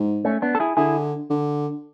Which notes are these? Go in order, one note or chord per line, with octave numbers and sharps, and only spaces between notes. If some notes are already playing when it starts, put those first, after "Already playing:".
Already playing: G#2
A3 C#4
B3 D4
A4
E4 G#4
D3 E4 G#4
D3